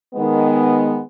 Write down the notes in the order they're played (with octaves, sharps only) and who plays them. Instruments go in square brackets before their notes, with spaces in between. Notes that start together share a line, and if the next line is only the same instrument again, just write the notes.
[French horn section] D#3 G#3 B3